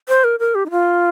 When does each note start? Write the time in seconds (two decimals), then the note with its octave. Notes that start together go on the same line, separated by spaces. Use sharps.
0.09 C5
0.24 A#4
0.40 A#4
0.55 G4
0.66 D#4
0.71 F4